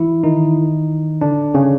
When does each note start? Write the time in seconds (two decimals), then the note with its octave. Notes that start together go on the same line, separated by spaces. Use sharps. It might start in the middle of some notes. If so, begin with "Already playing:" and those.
Already playing: E3 E4
0.24 D#3 D#4
1.21 D3 D4
1.54 C#3 C#4